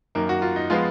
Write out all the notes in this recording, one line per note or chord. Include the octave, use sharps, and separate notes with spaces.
F#2 D#3 A#3 D#4
F#4
F4
D#4
F3 G#3 B3 F4